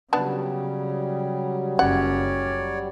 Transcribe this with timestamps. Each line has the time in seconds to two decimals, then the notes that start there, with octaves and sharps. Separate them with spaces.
0.13 C#3 F#3 G3 B3 D4 A5
1.79 F#1 C#4 C#5 D5 F#5